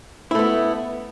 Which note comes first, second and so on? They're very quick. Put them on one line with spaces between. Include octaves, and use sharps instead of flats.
E4 A3 B3